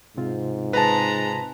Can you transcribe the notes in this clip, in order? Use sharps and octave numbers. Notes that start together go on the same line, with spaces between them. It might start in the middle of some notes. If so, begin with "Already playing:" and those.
G#2 C3 C4 F4
G#3 B4 A5 A#5